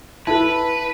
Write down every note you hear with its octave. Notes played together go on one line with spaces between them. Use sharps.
E4 A4 B4 A5